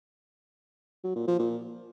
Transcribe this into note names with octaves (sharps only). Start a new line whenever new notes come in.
F#3
A#2
F3
A#2